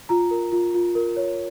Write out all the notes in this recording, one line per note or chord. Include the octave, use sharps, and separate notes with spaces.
F4 A#5
A#4
F4
F4
A#4
C#5